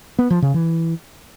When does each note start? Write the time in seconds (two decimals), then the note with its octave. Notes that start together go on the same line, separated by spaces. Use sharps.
0.19 B3
0.30 F3
0.42 C#3
0.54 E3